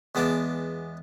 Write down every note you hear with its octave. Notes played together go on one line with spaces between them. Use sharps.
E2 G#3 B3 A5 D6